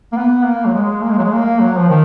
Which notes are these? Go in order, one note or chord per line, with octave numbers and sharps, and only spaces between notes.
A#3
B3
A#3
F#3
G#3
A#3
G#3
F#3
G#3
A#3
F#3
F3
D#3